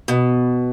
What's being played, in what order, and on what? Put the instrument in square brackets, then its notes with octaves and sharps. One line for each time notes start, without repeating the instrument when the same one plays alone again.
[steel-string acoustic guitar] B2